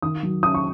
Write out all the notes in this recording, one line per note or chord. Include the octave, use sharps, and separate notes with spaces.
D#3 D#6
F#3
C#4 D#6
C#6